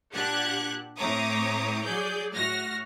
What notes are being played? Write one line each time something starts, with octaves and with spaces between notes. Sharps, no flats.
A#2 D4 G4 F#5 F#6 G#6
A2 C4 C#5 A#5 D6 D#6
F#3 G#4 D5 G6
A2 F#4 F6 A#6